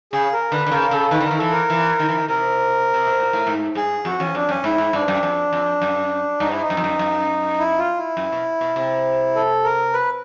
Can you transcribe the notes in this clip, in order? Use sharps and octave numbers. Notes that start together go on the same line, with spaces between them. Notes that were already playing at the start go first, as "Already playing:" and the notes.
C#3 G#4
A#4
D3 B4
D3
C#3 A#4
C#3 A4
D#3 B4
D3 A#4
D#3
E3 A4
A#4
E3
D#3
E3
D#3
C3 A#4
C3
B2
A#2
A2
G#2
G2 G#4
F2 F#4
E2 C#4
F2 D4
F#2 C#4
G#2 E4
G#2
G2 D4
F#2
F2
F2
F#2
G2 D#4
E4
D#4
F#2
F2
F#2
F#2
E4
F4
E4
F#2
B2
B2
C3
A4
A#4
B4